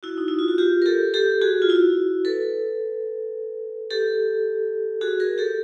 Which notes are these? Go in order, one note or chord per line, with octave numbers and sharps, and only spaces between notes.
E4 F#4
D#4
E4
F4
F#4
F4 G4
A#4
G4 A4
G4 A4
F#4 G#4
F4
E4 F#4
A4 B4
G4 A4
F#4 G#4
G#4 A#4
G4 A4